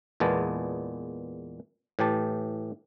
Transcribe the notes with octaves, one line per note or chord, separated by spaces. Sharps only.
E2 A#2 G#3 B3 A5
A2 E3 G4 A5